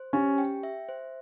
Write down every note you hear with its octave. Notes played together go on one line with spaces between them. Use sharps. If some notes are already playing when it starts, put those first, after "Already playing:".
Already playing: C5
C#4 G4
G5
E5
C5